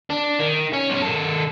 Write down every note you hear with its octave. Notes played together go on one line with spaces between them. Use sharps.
D4
D#3
C#4
B1 C#4
D#3 A4